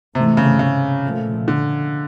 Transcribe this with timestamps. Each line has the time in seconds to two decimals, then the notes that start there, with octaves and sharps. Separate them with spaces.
0.15 G#2 C3 E3 A3
0.37 C#3
0.59 C#3
1.04 A#2 F3 A3
1.48 D3